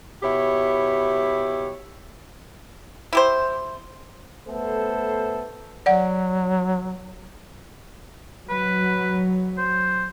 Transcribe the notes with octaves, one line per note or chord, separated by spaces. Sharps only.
B2 E4 G4 C#5
E4 G4 C5
A3 B3 A4 C5
F#3 D5 F#5
F#3 B4
C5